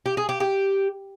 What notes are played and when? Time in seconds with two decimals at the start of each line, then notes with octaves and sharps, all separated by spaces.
0.06 G4
0.17 G#4
0.29 G4
0.40 G4